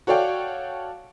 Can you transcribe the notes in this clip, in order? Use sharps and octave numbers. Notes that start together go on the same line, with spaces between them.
F#4 A4 C#5 D5 F5 G5